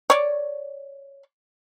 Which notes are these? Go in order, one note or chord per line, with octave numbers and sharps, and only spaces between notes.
C#5 D5